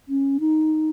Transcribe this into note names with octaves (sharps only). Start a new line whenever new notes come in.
C#4
D#4